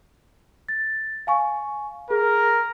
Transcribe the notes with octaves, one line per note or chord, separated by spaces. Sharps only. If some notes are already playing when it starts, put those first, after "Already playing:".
A6
F5 G#5 C#6
G#4 A#4